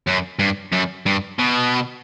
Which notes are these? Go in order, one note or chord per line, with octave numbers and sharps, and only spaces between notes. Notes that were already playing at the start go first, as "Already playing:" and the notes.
F#2
G2
F#2
G2
B2